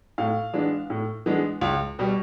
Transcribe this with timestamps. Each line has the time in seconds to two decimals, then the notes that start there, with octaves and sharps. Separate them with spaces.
0.18 A2 F5
0.53 E3 G#3 B3 D4
0.90 A2
1.26 E3 G#3 B3 D4
1.61 C#2
1.99 B2 G3